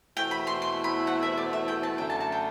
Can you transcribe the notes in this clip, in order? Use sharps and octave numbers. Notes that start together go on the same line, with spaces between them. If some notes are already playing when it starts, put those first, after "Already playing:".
E2 B2 A3 C4 E4 G5
B5
C6
C6
B5
F#5
E5
D5
E5
G5
A5
F#2 D3 A3 G5
A5
A5
G5